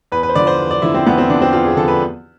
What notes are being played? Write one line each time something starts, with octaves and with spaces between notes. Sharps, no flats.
E2 B4
B4
C5
D3 F3 D5
C5
E2
D5
D3 F3 E4
C4
E2 B3
C4
D3 F3 D4
C4
E2 F4
G#4
D3 F3 A4
B4